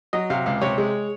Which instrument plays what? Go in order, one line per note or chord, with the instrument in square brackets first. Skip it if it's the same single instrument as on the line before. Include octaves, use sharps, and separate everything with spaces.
[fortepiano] F#3 D#5
C3 F5
C#2 F5
C3 C#5
G#3